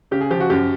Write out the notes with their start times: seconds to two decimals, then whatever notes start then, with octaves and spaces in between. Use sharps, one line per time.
0.11 C#3 G4
0.21 G#4
0.31 F3 G4
0.40 F#4
0.50 F#2 G4